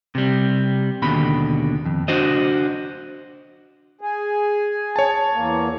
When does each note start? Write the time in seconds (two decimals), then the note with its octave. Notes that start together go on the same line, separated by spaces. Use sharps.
0.15 C3 G3
1.02 D#2 B2 D3 B5
1.85 F2
2.08 D4 F#4 C5 D#5
4.01 G#4
4.96 C#5 A5
5.33 E2 A#3